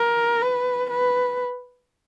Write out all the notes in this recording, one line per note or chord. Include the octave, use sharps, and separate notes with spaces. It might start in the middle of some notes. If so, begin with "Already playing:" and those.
Already playing: A#4
B4
B4